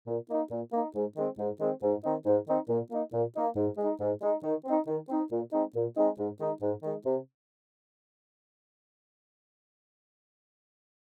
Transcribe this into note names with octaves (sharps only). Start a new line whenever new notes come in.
A#2
A#3 D#4
A#2
A#3 D#4
G#2
D#3 G#3 C4
G#2
D#3 G#3 C4
G#2
D#3 C4 D#4
G#2
D#3 C4 D#4
A#2
A#3 D#4
A#2
A#3 D#4
G#2
G#3 D#4
G#2
G#3 D#4
D#3
C4 D#4
D#3
C4 D#4
A#2
G#3 C4 D#4
A#2
G#3 C4 D#4
G#2
D#3 G#3 D#4
G#2
D#3 G#3 D#4
C3